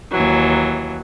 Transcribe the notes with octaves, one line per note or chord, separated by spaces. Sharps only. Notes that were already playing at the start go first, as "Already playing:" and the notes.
D#2 E3 F#3